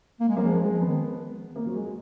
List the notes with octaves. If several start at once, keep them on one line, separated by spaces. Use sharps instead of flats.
A#3
G#3
F#3 A#3
F3 G#3
G#3
F3
D#3 B3
A#3
F#3
G#3